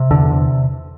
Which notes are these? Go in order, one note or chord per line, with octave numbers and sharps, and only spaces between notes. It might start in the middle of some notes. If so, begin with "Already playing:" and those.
Already playing: C3
E2 D3
C3